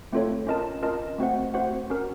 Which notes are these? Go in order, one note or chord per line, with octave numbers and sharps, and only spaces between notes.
A3 C4 F4 A4 C#5
C#4 F4 A#4 D#5 A5
C#4 F4 A#4 D#5 A5
A3 C4 F#4 C5 F#5
A3 C4 F#4 C5 F#5
C#4 F#4 A#4